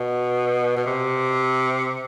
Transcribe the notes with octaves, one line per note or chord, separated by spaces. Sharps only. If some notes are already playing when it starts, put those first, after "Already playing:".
Already playing: B2
B2
C3